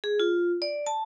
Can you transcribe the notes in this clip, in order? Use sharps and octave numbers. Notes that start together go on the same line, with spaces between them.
G#4
F4
D5
A5